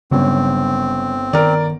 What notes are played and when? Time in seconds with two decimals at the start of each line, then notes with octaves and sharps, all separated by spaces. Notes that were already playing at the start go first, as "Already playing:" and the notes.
0.11 G1 C#3 F#3 G3 C4 C#4
1.33 D#3 A#4 D5